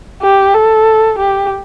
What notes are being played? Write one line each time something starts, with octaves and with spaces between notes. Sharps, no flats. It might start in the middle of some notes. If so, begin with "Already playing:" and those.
G4
A4
G4